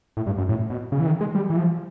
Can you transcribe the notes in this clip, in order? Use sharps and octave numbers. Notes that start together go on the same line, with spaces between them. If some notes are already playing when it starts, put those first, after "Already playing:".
A2
G2
F#2
A2
B2
C#3
E3
D#3
G#3
G3
E3
F3